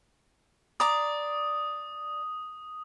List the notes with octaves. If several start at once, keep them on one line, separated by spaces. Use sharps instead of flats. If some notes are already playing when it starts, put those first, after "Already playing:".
D5 A#5 D6 D#6